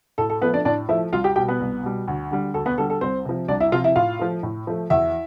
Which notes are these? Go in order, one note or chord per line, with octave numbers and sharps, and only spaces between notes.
A2 A4
A4
F3 A3 B3 B4
D4 D5
A2 D4 D5
F3 A3 E4 E5
C2 F4 F5
G4 G5
B2 G3 G4 G5
B3 B4
C2
B2 G3
D2
D3 G3
D2 A4
B3 B4
D3 G3 A4
A4
C2 C4 C5
C3 F3
C2 D4 D5
E4 E5
C3 F3 F4 F5
E4 E5
A2 F4 F5
F3 A3
A2
F3 A3
E2 E4 E5